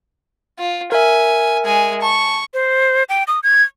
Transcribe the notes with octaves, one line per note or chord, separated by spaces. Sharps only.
F4
A#4 E5 G#5
G#3 G#5
A5 C#6
C5
G5
D#6
G#6